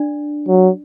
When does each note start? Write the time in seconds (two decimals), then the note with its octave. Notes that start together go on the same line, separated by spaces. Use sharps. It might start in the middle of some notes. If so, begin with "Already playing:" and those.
Already playing: D4 D5
0.48 F#3